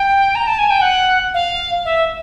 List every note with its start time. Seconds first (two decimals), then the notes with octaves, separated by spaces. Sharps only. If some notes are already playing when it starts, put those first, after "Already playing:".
Already playing: G5
0.35 A#5
0.47 A5
0.58 G#5
0.70 G5
0.81 F#5
1.34 F5
1.85 E5